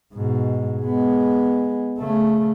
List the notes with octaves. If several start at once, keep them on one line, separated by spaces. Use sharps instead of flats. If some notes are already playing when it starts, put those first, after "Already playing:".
G#2 B2
G#3 B3
C#3 A3